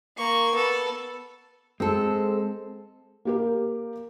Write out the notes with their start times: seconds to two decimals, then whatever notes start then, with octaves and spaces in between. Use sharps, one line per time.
0.17 A#3 C#6
0.53 B3 A4
1.80 G#3 C4 A4
3.25 A#3 G4 A#4